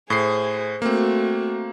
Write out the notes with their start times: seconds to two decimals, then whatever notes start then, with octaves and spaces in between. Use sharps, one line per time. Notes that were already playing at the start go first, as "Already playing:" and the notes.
0.10 A2 G#4 C5 C7
0.82 A3 A#3 C4 F#4